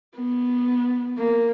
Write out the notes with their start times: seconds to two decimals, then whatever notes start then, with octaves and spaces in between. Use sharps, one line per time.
0.16 B3
1.19 A#3